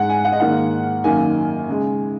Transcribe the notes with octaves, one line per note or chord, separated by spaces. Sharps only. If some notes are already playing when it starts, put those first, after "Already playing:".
Already playing: G#2 G#3 F#5
G#5
F#5
D#5
G#2 D#3 A#3 F#5
F#2 D#3 A#3 G#5
C#3 G#3